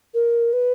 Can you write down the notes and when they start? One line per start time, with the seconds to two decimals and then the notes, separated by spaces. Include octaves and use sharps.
0.14 A#4
0.53 B4